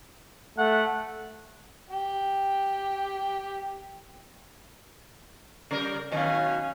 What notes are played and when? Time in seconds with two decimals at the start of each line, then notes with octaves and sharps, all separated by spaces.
0.58 A3 F#5
1.90 G4 G5
5.71 C#3 G3 A#4
6.12 B2 D#3 F#3 C#4 F5